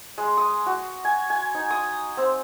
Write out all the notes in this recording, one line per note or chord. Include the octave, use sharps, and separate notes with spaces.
G#3
D#6
F#4
G#5
G#5
D#4
D#6
C4